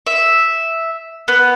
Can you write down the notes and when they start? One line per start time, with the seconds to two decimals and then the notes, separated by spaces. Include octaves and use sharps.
0.07 E5
1.28 B3